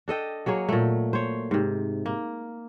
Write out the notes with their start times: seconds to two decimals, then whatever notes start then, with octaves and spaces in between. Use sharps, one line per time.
0.08 D4 A4 D#5 G5
0.46 F#3 A#3 G#4 C#5
0.69 A#2 A3
1.13 C5 C#5
1.51 G#2 C3
2.06 A#3